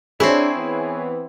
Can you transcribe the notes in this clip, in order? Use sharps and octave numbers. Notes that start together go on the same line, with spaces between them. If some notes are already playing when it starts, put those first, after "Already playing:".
C4 D4 E4 G#4 C#5
E3 B3